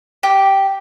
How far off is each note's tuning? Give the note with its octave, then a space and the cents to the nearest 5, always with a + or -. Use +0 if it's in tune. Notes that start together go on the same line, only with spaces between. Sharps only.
G4 -5